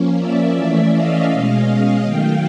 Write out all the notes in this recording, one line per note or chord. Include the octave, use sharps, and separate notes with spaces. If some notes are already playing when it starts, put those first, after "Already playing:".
Already playing: F3 A#3 C#4
D5 E5
E3 A3 C#4
D#5 F5
B2 G#3 C#4
D#3 F#3 A3 F5 G5